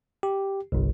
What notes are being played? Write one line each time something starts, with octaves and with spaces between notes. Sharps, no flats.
G4
G1 C2